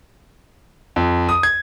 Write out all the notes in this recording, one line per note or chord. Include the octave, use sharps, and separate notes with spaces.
F2
D#6
G#6